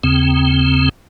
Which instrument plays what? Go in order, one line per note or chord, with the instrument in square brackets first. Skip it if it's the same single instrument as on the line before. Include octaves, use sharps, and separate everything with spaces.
[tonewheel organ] D#2 C#3 C4